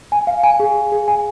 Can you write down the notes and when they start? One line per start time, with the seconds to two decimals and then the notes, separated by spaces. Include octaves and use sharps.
0.12 G#5
0.27 F5
0.44 G#5
0.60 G#4
0.75 G#4
0.92 G#4
1.08 G#5